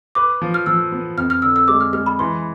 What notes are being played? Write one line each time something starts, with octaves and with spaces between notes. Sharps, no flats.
B4 D6
F3
F6
F3 E6
B3
F2 F6
F6
D3 E6
E6
G#3 D6
F6
G#3 F6
B5
E3 C6